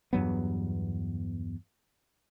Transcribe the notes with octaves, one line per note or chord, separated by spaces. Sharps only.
E2 G2 F#3 B3